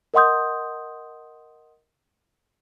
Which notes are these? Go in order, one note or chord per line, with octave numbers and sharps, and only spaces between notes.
A#4 D#5 F#5 C6 D#6 G6